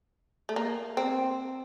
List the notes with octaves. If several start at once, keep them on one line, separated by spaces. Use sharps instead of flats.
A3
A#3
C4